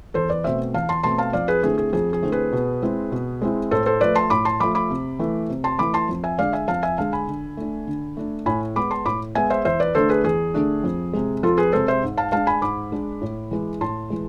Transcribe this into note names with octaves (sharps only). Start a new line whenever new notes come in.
E2 A4 C5
B4 D5
B2 A3 C4 C5 E5
E2 F5 A5
A5 C6
B2 A3 C4 A5 C6
F5 A5
F2 D5 F5
G#4 B4
D3 A3 C4 E4 G#4
G#4
F2 G#4
G#4
D3 A3 C4 E4
G#4 B4
B2
G#3 C4 E4
B2
G#3 C4 E4
A2 A4 C5
A4 C5
F3 A3 B4 D5
A5 C6
A2 B5 D6
A5 C6
F3 A3 B5 D6
B5 D6
C3
E3 A3
C3
A5 C6
E3 A3 B5 D6
A5 C6
F2
E5 G#5
D3 G#3 D5 F5
E5 G#5
F2 F5 A5
E5 G#5
D3 G#3 F5 A5
G#5 B5
D3
A3 D4
D3
A3 D4
A2 G#5 B5
G#3 B3 B5 D6
A5 C6
A2 B5 D6
G#3 B3 E5 G#5
C5 E5
E2 C5 E5
B4 D5
D3 A3 D4 A4 C5
G#4 B4
E2 G#4
D3 A3 D4
F2
C3 G#3
F2 F4 A4
G#4 B4
C3 G#3 A4 C5
C5 E5
G#2
F5 A5
G#3 D4 F5 A5
G#5 B5
G#2 B5 D6
G#3 D4
A2
E3 G#3
A2 A5 C6
E3 G#3